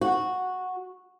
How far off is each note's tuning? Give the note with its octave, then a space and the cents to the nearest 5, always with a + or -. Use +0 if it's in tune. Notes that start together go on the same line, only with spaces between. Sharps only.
F#4 -5